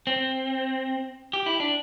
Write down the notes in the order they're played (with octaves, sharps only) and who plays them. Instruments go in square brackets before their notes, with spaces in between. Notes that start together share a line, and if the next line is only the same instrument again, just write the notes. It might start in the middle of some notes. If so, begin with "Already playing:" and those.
[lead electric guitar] C4
G4
E4
D4